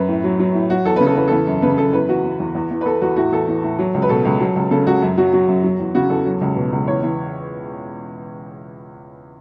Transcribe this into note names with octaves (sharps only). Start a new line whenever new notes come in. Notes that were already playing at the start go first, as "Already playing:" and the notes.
Already playing: F#2 B4
A2
F#3
F#3
A2
F#3 F#4
E2 A4
C#3 B4
A4
E2 B4
E3 A4
F#2
C#3 B4
F#2 A4
E2 B4
E3 F#4
E3
E2
E2
E3
B4
E3 A4
E2 F#4
A2 F#4
E3 A4
E3
A2
F#3
C#2
B4
B2 A4
C#2
F#3
C#2
C#3 A4
C#2 F#4
F#2
F#3 F#4
F#3 F#4
F#2
F#3
E2
C#3 F#4
E2 A4
F#3
C#2
B2
C#2
E2 C#5
E3